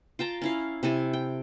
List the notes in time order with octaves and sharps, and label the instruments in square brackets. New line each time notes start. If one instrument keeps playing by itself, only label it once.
[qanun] F4 G5 A5 A#5
C#4 E4 F5
C3 E4 A4 G#5
G5